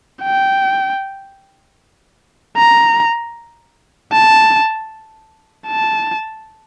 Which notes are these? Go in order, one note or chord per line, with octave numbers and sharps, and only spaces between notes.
G5
A#5
A5
A5